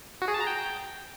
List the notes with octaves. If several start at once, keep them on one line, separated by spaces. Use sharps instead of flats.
F#4
G#4
A5
A#5
G5